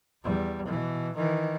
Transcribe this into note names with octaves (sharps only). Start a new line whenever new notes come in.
E2 G3
B2 E3
D#3 E3